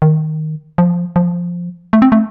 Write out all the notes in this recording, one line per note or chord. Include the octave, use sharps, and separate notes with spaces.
D#3
F3
F3
A3
C4
A3